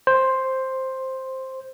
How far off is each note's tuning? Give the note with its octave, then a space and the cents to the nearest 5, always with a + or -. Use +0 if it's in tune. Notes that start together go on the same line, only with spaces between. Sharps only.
C5 +5